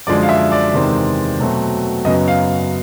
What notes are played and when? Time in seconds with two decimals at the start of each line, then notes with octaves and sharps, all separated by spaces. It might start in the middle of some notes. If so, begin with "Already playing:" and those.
0.07 F#2 D3 F3 G#3 D5
0.23 F5
0.29 E5
0.52 D5
0.74 E2 C3 D#3 G#3 C4
1.39 B2 F#3 A3 C4
2.05 F#2 C#3 F#3 B3 D#5
2.28 F5